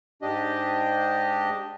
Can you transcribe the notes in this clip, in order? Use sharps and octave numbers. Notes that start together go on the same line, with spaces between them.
G#2 D4 G4 D#5